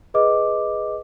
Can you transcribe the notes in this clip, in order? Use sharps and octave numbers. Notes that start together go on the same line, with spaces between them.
G#4 B4 D#5 D6